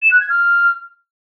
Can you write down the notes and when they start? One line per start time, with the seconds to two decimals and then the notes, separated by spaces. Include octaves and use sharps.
0.02 E7
0.11 F#6
0.20 G#6
0.30 F6